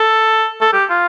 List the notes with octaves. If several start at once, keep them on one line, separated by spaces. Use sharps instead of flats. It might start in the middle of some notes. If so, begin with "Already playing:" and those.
Already playing: A4
A4
G4
F4